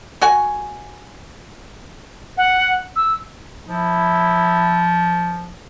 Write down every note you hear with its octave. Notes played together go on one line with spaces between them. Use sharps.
F#4 F#5 G#5
F#5
E6
F3 E4